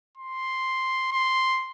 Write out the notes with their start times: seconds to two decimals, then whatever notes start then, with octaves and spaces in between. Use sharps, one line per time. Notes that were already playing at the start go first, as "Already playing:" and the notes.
0.18 C6
1.12 C6